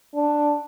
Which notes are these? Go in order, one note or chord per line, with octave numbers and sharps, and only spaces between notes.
D4